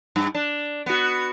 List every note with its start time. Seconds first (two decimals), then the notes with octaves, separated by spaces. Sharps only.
0.16 G2
0.35 D4
0.86 B3 F#4